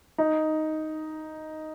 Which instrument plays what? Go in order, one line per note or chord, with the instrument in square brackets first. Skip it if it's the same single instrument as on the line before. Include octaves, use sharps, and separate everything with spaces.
[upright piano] D#4